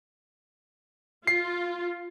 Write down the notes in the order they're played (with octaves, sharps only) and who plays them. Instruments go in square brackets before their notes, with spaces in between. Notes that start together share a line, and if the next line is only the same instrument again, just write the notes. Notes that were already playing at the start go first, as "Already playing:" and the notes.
[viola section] F4 [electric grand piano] C7